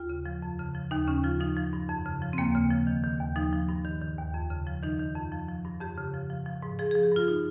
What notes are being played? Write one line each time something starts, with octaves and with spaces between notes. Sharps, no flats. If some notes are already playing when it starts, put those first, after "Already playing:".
Already playing: D#2 F4
C#3
F3
F2
C#3
F3
D#2 D#4
C#3 C#4
F3 F4
F3 D#4
F3
G2
F2
C#3
F3
C4
D#2 A#3
C#3
F3
D#3
D#3
D#2
F3 D#4
F3
G2
D#3
D#3
D#2
F2
C#3
F3
D#3 D#4
D#3
F2
F3
F3
G2
F2 G4
C#3
F3
F3
F3
G#2
F3 G#4
G#4
F3
G4
G2 F4
D#4